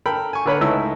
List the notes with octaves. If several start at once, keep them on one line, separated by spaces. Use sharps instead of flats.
A4 A#4 G5 B5
G#5 C#6
D3 A#4 B4 C#5 B5
C#2 A3 D#4 E4 E6